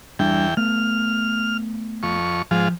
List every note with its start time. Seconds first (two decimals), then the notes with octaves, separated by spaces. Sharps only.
0.19 E2 G3 D4 G5
0.57 A3 B3 F6
2.03 F2 C#6
2.51 G#2 F3 F4